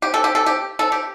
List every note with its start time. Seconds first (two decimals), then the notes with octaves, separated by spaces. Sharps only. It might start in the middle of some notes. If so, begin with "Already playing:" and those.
0.02 G4
0.14 A4
0.24 G4
0.35 A4
0.46 G4
0.79 A4
0.92 G4